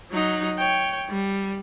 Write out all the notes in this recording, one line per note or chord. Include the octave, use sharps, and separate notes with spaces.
F#3 D#4
C#5 G5
G3